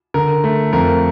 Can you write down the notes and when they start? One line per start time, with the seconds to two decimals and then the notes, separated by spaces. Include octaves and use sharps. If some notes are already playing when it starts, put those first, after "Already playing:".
0.14 D3 A#4
0.44 A3
0.73 F2 A#4